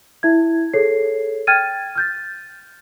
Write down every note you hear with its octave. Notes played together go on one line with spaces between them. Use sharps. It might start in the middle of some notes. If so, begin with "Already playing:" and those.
E4 E5 G#6
G#4 A4 C#5 C7
G5 F6 G#6 A6 D#7
F6 G6 A6